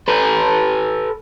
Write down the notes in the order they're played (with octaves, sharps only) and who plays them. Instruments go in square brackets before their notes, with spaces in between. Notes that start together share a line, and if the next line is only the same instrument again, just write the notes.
[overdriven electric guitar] A4 B4